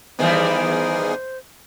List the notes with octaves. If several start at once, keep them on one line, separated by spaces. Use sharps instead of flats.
D#3 E3 G3 B3 G#4 C5